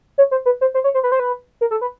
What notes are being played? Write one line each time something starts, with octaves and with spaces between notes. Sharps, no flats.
C#5
C5
B4
C5
C5
C#5
C5
B4
C5
B4
A#4
A4
B4